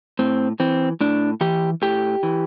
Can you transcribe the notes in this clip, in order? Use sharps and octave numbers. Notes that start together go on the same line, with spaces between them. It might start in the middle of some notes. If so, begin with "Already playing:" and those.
A2 C4
E3 C4
A2 D4
E3 G4
A2 G4
E3